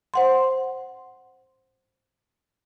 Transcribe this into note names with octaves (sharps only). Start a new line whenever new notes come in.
C5 F#5 C6